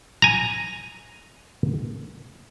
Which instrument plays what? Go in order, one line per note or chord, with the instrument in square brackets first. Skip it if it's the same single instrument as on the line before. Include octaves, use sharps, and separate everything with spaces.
[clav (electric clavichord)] G#5 A#5